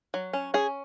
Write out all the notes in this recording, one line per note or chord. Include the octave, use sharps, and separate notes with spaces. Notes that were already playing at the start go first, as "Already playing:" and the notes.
F#3
C#4
C#4 G#4